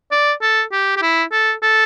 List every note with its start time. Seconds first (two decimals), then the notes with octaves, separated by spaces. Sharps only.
0.11 D5
0.42 A4
0.72 G4
0.96 G4
1.02 E4
1.32 A4
1.63 A4